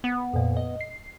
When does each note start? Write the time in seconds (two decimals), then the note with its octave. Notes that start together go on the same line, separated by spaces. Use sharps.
0.04 B3
0.34 F2 A#2
0.57 D#5
0.81 C7